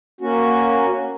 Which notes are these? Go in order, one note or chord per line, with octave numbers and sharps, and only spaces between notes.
A#3 C#4 F#4